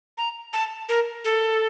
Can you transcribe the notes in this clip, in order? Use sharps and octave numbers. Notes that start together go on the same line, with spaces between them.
A#5
A5
A#4
A4